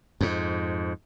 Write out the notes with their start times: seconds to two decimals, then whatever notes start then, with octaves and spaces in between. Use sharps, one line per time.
0.21 F2 G#2